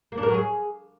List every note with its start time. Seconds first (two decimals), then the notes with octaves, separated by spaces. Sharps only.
0.12 A#3
0.17 D4
0.23 A#4
0.28 F#3
0.34 G#4